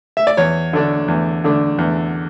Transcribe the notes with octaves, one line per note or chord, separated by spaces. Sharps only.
E5
D5
E2 C#5
D3 A3 D4
E2
D3 A3 D4
E2